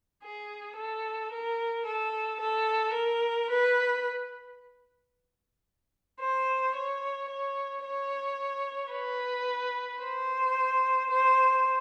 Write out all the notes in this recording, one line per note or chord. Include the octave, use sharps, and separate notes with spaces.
G#4
A4
A#4
A4
A4
A#4
B4
C5
C#5
C#5
C#5
B4
C5
C5